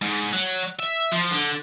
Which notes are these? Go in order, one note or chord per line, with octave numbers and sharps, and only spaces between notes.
G#2
F#3
E5
F3
D3